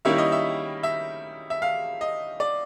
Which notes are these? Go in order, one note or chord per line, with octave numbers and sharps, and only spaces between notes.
D#3 G3 A#3 C#4 E4 E5
D#5
E5
E5
E5
F5
D#5
D5